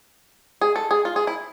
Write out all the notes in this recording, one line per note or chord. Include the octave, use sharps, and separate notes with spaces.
G#4
A4
G#4
F4
G#4
E4